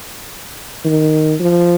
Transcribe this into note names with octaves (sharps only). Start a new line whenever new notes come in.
D#3
F3